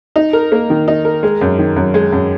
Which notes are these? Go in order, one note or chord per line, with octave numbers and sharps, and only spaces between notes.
D#4
A#4
A#3
D#3
D#4
A#4
G#3
F#2
D#3
F#2
G#3
F#2